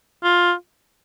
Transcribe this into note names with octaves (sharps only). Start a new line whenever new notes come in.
F4